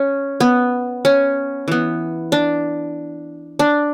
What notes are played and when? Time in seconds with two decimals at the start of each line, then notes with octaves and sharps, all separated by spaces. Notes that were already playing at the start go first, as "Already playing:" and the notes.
Already playing: C#4
0.40 B3
1.05 C#4
1.68 E3 B3
2.32 D4
3.59 D4